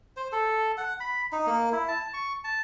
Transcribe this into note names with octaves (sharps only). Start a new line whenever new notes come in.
C5
A4
F#5
B5
D#4
A#3
E4
A5
C#6
A5